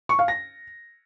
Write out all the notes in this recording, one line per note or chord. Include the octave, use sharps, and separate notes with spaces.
C#6
F5
A#6